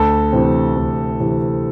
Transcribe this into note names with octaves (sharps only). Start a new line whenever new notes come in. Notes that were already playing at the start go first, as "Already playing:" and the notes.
Already playing: D2 A4
C3 E3 C4
D2
C3 E3 C4